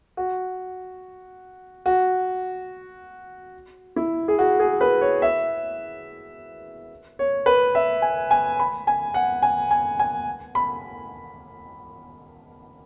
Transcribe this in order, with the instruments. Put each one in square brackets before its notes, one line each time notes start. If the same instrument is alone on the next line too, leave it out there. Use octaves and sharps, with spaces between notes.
[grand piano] F#4
F#4
E4
G#4
F#4
G#4
B4
C#5
E5
C#5
B4
E5
G#5
G#5
B5
G#5
F#5
G#5
G#5
G#5
B5